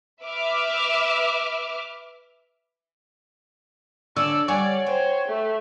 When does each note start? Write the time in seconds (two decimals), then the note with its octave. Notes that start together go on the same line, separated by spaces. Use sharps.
0.23 B4 E5 D6 F6
4.16 D3 C#5 D5 G#5 E6
4.48 G3 C#5 D5 F#5 G#5
4.86 C5 G5
5.28 A3